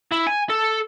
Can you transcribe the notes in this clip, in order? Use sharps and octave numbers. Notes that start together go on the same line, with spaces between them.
E4
G#5
A4